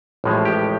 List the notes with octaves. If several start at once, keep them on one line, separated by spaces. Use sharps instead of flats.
A1 A2 F3 G#3
G4